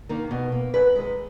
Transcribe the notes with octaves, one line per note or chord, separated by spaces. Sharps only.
D#3 A#3
B2
A#3
F#2 B4
D#3 G#3